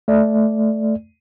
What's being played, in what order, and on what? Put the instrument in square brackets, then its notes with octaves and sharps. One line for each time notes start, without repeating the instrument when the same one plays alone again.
[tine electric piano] A3 D5